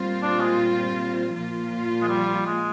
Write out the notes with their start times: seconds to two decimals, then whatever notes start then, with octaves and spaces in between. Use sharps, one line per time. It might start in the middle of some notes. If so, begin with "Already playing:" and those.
Already playing: A#2 G3 C4 F4
0.23 D4
0.41 G#3
1.34 A#2 F3 A#3 F4
2.02 G#3
2.08 G3
2.46 G#3